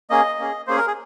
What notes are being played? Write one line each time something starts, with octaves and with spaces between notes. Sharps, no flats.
A#3 C#4 G#4 D#5
A#3 C#4 G#4
A#3 C#4 G#4 C5
A#4
G#4